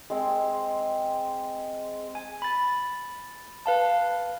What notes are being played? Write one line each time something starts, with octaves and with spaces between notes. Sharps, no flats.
G#3 C4
G#5
B5 A6
B4 F5 A5